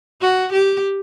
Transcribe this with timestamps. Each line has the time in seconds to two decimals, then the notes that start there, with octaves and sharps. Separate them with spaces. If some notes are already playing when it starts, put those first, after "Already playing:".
0.21 F#4
0.53 G4